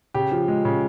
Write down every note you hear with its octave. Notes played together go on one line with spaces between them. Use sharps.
C#3 G4
F3
G#3
C#3